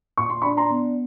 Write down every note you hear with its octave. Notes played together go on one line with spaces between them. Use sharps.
A#2 C#6
C6
D4 B5 C#6
A#5 C6
B3